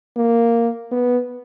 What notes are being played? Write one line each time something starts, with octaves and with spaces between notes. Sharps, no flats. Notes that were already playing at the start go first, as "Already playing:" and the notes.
A#3
B3